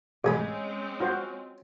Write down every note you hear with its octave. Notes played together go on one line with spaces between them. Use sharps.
A1 G#3 C4 C#4 G#4 B5
F4 F#4 C5